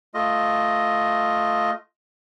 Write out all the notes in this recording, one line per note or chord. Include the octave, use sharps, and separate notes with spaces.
A3 F4 D#5